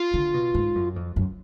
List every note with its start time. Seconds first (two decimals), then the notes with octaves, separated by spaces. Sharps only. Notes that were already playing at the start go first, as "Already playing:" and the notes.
Already playing: F4
0.14 D3
0.34 B2
0.54 G#2
0.75 F#2
0.96 F2
1.16 F#2